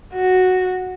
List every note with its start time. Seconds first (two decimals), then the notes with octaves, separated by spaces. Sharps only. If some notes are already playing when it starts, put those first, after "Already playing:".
0.14 F#4